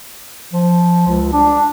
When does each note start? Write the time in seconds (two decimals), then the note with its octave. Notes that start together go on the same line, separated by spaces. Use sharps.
0.53 F3
1.07 C#2
1.32 D4